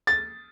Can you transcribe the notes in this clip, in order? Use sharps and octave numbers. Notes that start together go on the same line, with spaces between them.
A6